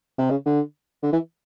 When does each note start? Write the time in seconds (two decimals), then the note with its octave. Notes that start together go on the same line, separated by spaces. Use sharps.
0.18 C3
0.30 C#3
0.46 D3
1.03 D3
1.13 E3